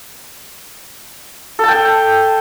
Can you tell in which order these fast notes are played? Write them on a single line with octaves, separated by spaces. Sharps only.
A4 A5 G5